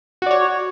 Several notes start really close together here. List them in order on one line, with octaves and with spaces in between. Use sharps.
F#4 D5 C#5